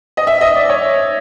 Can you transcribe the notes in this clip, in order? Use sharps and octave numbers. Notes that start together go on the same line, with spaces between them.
D#5
E5
D#5
D5
C#5